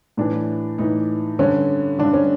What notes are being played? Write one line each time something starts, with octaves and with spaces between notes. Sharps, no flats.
A2 E3 D4
A2 E3 D#4
G2 D3 C#4
G2 D3 D4
C#4